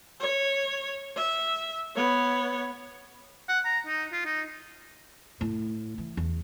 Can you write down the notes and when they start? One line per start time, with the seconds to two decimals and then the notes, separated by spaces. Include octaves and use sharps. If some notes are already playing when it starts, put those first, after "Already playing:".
0.20 C#5
1.16 E5
1.96 B3 C#5
3.49 F#5
3.65 A#5
3.87 D#4
4.12 F4
4.25 D#4
5.41 A2
5.98 E3
6.17 E2